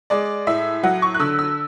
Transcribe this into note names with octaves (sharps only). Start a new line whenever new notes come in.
G#3 D5
A2 E5
F#3 F#5
C#6
F#6
D3 E6
E6